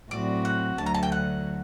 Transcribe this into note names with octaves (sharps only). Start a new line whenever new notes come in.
A2 F#3 C4 F#4 D5
F#5
D2 D3 F#3 A5
A#5
A5
G5
F#5